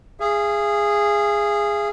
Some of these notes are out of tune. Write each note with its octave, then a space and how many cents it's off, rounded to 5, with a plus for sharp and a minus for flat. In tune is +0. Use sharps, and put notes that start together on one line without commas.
G#4 -10 F5 -45